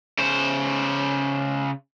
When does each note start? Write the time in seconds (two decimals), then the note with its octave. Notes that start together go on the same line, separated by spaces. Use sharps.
0.18 C#3 C5